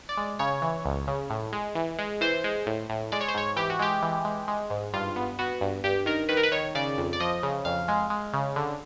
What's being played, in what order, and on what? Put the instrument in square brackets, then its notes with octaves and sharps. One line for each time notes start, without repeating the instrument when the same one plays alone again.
[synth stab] D5
G#3
C#3 C#5
E3
C#2
C#3
A2
G#3
E3
G#3
E3 C5
G#3
A2
A2
G#3 D5
C#5
C5
G#2 C#5
E3 G4
F#4
G#3 G4
E3
G#3
G#3
G#2
G2 F4
B3
B3 F#4
G2
G2 G4
D#3 A#4
D#3 B4
A#4
B4
D#3 C#5
C#3 D5
F2
D5
F3 D#5
C#3
F2 F5
G#3
G#3
C#3
D3